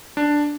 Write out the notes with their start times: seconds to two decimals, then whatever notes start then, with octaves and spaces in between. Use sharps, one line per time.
0.17 D4